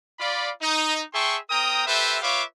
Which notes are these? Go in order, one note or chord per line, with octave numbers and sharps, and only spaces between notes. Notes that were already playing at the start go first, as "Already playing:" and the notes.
F4 D5 B5
D#4
G#4 E5 G5 A5 C6 C#6
C4 A#4 G5 A#5 D#6
G4 A4 B4 C5 E5
F4 B4 C#5 E5 F5 D6